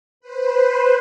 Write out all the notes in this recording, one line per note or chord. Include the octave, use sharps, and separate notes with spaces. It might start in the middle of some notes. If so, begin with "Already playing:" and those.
B4 C5